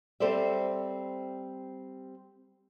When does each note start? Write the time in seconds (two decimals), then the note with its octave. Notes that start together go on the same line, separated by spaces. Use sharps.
0.20 G3 C4 A4 C5 D5 E5